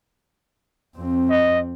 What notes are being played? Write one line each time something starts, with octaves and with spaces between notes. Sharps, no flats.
F2 C4
D#5